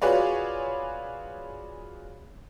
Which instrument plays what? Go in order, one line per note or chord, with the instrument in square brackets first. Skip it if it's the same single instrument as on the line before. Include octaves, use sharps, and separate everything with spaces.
[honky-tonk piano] F4 F#4 G#4 B4 C#5 D5